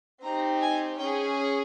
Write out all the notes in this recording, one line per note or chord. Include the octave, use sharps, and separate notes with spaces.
C4 D#4 G4 A#5
G#5
C#4 G#4 G5